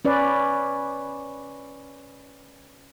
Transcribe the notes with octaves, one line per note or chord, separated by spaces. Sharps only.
C#4 B4 D5